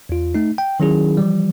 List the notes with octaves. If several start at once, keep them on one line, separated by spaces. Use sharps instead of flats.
E2 F4
A3 D#4
G5
D#3 F#3 C#4 E4 G#4
E3 F3 G3